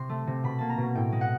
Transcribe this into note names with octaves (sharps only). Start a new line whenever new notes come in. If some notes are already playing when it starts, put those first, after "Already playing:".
Already playing: C3 C6
A3
C3
B2 B5
A#3 A5
A#5
B2
A2 G5
G#3
F#5